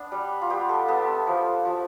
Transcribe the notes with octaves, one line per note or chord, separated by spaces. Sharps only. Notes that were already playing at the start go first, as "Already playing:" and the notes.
Already playing: B3 D4
G3
F4
B3 G4
A4
B3 A4
E5
F3
F3